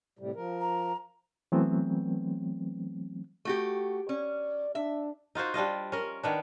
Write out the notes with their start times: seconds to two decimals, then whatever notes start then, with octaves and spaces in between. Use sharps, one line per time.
0.19 A2 C3 G3
0.35 F3 A#4
0.61 A#5
1.52 E3 F#3 A3 B3 C4
3.45 A3 F#4 G4
4.09 C#4 D5
4.75 D4 E5
5.35 D#4 F4 F#4 C5
5.54 G3 D4 F4 D#5
5.92 C#4 A#4
6.23 D#3 B3 D4